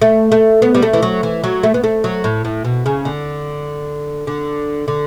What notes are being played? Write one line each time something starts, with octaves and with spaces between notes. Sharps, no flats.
A3
A3
B3
G3
A3
E3
F#3
E3
F#3
A3
B3
A3
F#3
A2
A2
B2
C#3
D3
D3
D3